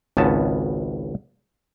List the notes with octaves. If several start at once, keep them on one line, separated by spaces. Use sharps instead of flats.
G#1 C#2 B3 C#4 A5